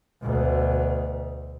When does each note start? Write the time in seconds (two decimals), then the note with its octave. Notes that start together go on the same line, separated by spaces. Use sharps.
0.23 D2 B2